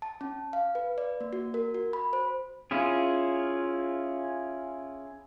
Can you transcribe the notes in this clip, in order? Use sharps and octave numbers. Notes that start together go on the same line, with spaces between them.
A5
C#4
F5
B4
D5
A#3
F#4
A#4
F#4
B5
C5
C#4 E4 F4 G#4